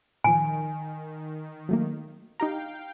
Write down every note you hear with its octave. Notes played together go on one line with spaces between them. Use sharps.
A#2 D#3 F3 G#5
F#3 A3 A#3
D#4 G4 F5 G5 A#5